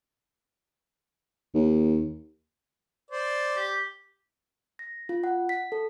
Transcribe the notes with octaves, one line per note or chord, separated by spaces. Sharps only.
D#2
C5 D5
G4
A#6
F4
F#5
B6
A4